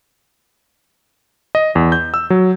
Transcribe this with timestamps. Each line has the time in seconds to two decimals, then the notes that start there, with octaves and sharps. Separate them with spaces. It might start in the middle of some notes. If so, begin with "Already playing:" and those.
1.55 D#5
1.75 E2
1.92 G6
2.14 E6
2.30 F#3